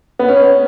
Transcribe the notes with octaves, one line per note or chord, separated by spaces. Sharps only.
B3
C#4